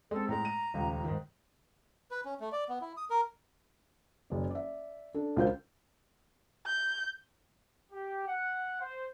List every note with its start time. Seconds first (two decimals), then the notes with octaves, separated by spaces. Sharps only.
0.11 G#3 C4 A4
0.29 A2 G#3 A#5
0.45 D#7
0.74 D#1 C#2
1.04 G#2 D#3
2.11 B4
2.25 C#4
2.40 A3
2.52 D5
2.69 B3
2.81 E4
2.97 D#6
3.10 A#4
4.30 F#1 D5
4.51 D5 E5
5.14 D4 A4
5.37 C#2 D4 F4 A#4 C5 G6
6.66 G6
7.92 G4
8.28 F#5
8.80 C5